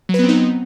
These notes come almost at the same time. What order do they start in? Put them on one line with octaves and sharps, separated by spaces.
F#3 B4 B3 C4 D#4